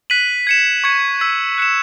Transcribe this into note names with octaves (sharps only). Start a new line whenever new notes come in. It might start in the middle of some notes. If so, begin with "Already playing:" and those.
F#6 B6 D#7 F#7
G#6 C#7 E7
C#6 G#6 C#7 E7
E6 G#6 B6
F#6 C#7 E7